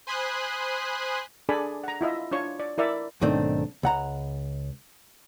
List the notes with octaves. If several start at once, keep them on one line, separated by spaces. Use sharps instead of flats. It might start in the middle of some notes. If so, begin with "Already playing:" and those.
C5 G#5 B5 C6 D#6 F#6
D4 G#4 A4 D5 G#5 B5
F#5 A#5
E4 F4 D#5 E5
D4 F4 C#5 C#6
D5
E4 A#4 D5 E5
B1 G#2 D#3 A3 C4 D4
C#2 F#5 A#5